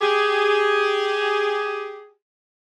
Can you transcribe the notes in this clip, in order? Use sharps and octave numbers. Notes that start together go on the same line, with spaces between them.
G4 G#4